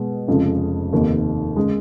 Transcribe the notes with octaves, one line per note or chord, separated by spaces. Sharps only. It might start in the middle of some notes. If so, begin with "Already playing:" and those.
Already playing: B2 G#3
F1 F2 C#3 F3 G#3
F1 D#2 D#3 A#3
C#3 G#3